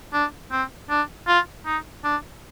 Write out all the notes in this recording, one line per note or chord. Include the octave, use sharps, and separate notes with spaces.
D4
C4
D4
F4
D#4
D4